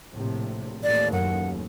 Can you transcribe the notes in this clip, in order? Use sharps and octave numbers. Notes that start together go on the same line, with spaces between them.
A#1 A2 C3
A1 D#2 D5
F#2 F#5